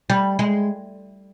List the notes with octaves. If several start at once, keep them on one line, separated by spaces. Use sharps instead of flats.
G3
G#3